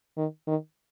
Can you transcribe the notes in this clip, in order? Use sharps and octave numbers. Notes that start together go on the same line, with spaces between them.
D#3
D#3